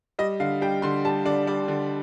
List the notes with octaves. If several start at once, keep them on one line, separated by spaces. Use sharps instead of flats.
G3 D#5
D3 F5
G3 G5
D3 C6
G3 A5
D3 D5
G3 D5
D3